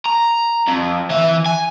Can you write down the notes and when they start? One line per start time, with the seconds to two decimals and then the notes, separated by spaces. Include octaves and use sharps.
0.06 A#5
0.68 F2
1.10 E3 E5
1.46 G#5